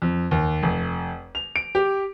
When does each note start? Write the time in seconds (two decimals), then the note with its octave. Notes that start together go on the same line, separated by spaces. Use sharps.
0.02 F2
0.31 D#2
0.63 F1
1.35 F7
1.56 D7
1.75 G4